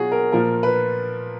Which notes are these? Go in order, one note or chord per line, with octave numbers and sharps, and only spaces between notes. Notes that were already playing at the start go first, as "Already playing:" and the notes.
Already playing: B2 F#3 F4 F#4 G#4
A#4
A#2 F3 A#4
B4